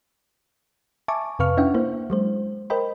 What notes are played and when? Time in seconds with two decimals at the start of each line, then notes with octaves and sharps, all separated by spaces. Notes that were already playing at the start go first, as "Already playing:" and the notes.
1.08 E5 G#5 A5 C#6 D6
1.39 F2 C3 B4 F5 C#6 F6
1.57 C#4 D4 E4 E5 F#5 G5
1.74 A#3 E4 C5
2.10 F#3 G#3 C5
2.70 A#4 C5 D#5 G5 B5